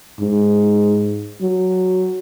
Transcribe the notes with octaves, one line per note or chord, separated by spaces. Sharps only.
G#2
F#3